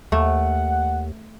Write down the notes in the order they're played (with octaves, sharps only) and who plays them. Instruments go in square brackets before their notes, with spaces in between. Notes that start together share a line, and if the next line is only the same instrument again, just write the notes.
[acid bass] D#2 [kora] A3 [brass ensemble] F#5